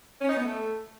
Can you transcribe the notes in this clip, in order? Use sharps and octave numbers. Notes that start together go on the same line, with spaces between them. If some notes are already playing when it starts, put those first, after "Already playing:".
C#4
D#4
B3
A3